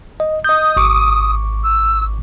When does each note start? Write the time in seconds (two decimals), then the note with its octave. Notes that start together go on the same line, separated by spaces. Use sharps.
0.20 D#5
0.45 D#5 D#6 G6
0.77 G#1 C#6 D6
1.63 E6